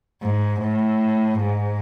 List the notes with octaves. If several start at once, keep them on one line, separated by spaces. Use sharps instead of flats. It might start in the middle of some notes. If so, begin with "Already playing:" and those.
G#2
A2
G#2